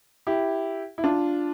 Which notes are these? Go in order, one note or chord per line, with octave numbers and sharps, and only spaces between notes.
E4 G4
E4
D4 F4